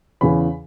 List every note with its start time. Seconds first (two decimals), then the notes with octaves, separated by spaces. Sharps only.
0.21 E2 C#3 E3 B5